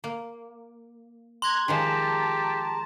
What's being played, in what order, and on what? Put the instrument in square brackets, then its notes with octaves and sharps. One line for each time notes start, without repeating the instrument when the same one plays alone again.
[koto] A#3
[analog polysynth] A#5 F#6 G#6 [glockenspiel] C6
[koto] D#3 F3 G#3 [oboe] G4 [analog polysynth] A5 A#5